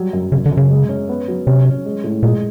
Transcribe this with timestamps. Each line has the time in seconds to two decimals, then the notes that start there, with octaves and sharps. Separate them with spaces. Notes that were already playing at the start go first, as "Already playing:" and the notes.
Already playing: F#3 G3
0.13 F#2
0.32 F#2 C#3
0.46 D3
0.51 F#2
0.57 C#3
0.70 G#3
0.89 C#4
1.09 B3
1.28 F#3
1.47 C3 C#4
1.65 C#4
1.85 G#3
2.04 A2
2.23 A#2 G#3